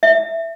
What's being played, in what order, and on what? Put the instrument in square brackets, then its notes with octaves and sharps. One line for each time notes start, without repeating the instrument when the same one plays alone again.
[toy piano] E5